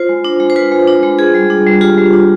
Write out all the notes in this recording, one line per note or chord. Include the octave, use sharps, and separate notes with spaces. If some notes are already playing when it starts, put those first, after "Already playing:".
Already playing: F4 C5
G#3
D4
G#3
C5
F4 B4
G#3
D4
G#3
F4 G#4
G3
D4
G3
F4 G4
G3
D4